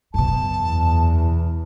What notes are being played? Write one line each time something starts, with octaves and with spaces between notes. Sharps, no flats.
F#2 B2 A5
E2